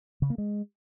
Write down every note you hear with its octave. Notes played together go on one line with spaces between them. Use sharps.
C#3
A#3
G#3